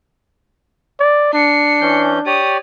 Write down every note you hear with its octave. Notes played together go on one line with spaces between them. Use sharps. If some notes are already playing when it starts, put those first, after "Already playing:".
D5
D4 C7 C#7
E3 C#4 G6
G4 C#5 D5 D#6